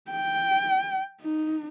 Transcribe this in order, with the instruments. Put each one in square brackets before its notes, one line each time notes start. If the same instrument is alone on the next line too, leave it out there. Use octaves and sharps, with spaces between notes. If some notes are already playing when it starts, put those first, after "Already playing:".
[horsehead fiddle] G5
D#4